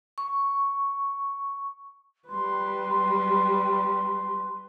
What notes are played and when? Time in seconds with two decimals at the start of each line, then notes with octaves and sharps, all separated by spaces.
0.18 C#6
2.28 G3 B4 C6